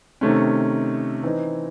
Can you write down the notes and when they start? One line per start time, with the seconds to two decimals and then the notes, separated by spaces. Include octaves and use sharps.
0.21 C3 D#3 A3 C#4
1.23 E3 C4 D#4